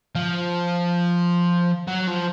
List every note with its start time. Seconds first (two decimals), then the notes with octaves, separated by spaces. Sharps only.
0.15 F3
1.87 F#3
2.07 F3